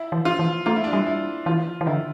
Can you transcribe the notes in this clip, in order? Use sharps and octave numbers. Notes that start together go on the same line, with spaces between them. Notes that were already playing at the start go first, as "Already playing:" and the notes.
Already playing: E4
E3
F4
E3
A3 F4
E4
D4
G3 E4
E4
E3 F4
E3
D3 E4